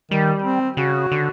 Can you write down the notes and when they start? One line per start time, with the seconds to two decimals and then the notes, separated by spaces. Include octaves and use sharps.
0.11 D#3 G3
0.43 C4
0.77 C#3 F#4
1.12 D3